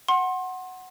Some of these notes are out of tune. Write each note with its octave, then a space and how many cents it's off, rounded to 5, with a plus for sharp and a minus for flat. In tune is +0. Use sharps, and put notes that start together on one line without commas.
F#5 +0 C6 +30